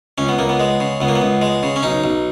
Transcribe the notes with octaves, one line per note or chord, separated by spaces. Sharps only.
C#2 C#4
B3
C#2 A#3
B3
G#3
C#3
C#2 B3
A#3
B3
C#2
G#3
C#3
C#4
B1 D#4
B1